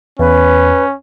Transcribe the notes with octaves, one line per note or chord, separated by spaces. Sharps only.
E2 C#4 B4